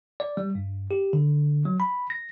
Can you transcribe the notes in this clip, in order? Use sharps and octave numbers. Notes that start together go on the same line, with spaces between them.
D5
G3
G2
G4
D3
F#3
B5
A#6